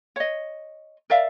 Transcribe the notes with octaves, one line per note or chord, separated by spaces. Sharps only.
C#5 D#5
A#4 D5 E5 F5